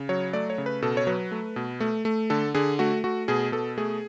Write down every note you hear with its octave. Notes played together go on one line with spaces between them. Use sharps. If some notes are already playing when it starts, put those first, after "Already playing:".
Already playing: C#3
F#3 C#5
A3 D5
C#5
C#3
B4
B2 A4
C#5
F#3 B4
A3
B2
A3
A3
D3 A4
D3 G#4
A3 F#4
A3 F#4
B2 G#4
B2 A4
A3 G#4